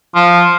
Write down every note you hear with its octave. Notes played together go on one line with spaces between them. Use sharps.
F3